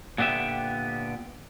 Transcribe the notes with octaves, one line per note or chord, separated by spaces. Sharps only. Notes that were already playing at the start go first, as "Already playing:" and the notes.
A#2 D3 B3 G4 E5